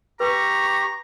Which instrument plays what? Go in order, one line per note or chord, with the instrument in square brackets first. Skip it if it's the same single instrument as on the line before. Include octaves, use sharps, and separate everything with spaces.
[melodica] G4 [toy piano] B4 [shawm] A#5 [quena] C#6